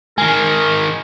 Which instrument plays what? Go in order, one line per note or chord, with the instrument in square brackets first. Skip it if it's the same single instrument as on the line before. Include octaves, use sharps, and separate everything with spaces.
[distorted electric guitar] D#3 G#3 [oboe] A#4 [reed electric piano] G#5